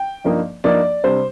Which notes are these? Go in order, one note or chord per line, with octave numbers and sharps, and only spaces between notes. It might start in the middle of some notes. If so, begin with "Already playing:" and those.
Already playing: G5
G2 F3 A#3 D#4
G2 F3 A#3 D#4 D5
C3 G3 D4 C5